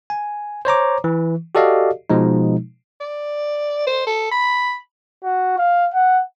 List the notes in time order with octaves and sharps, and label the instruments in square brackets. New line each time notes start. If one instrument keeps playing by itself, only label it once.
[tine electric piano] G#5
C5 C#5 A#5 D6
E3
F#4 G4 A4 D5 D#5 F5
B2 F3 G#3 D#4
[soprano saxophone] D5
C5
A4
B5
[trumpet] F#4
F5
F#5